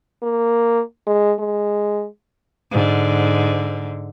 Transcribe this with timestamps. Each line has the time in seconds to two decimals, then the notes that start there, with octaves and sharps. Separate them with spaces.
0.23 A#3
1.07 G#3
1.39 G#3
2.71 G#2 D3